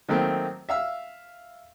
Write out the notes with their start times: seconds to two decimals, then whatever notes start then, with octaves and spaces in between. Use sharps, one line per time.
0.09 D#3 F#3 A3 A#3 C4
0.69 E5 F5 E6